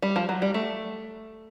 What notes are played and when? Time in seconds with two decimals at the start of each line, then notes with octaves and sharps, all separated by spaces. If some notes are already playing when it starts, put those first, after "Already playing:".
0.02 G3
0.16 F3
0.29 F#3
0.42 G3
0.54 A3